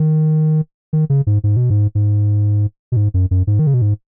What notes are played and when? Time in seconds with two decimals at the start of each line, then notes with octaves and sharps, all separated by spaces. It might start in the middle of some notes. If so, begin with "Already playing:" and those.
Already playing: D#3
0.93 D#3
1.10 C#3
1.27 G#2
1.44 G#2
1.56 B2
1.70 G#2
1.95 G#2
2.92 B2
2.96 G#2
3.14 F#2
3.31 F#2
3.47 G#2
3.59 D#3
3.67 C#3
3.74 B2
3.82 G#2